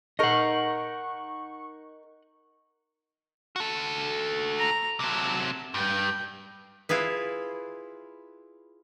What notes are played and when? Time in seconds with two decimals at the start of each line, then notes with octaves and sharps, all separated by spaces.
0.19 D#4 A#4 D#5 F#5 C#6
3.56 F#4 A4
4.59 A#5
5.00 C3 F#3 A5
5.74 G2 G5
6.89 E4 F4 G#4 B4